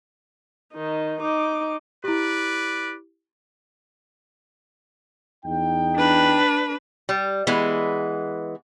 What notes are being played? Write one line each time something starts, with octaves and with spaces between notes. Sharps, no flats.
D#3 D#4
D#4 D6
E4 G4 B4 D5
E2 D#4 G5
D4 B4
G3
E3 G#3 B3